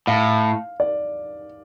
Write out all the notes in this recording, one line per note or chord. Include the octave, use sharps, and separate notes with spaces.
A2 F5
D5